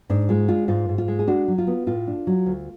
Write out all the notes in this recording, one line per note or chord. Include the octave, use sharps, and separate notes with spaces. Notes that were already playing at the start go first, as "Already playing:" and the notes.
G#2 D4
G#3 F4
D4 F4
G#2 F4
G#2
F4
G#3
G#4
D4 F#4
F#3
F4
B3
A2 F4
D4
F#3
D2